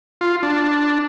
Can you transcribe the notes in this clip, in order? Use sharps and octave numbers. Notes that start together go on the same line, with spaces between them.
F4
D4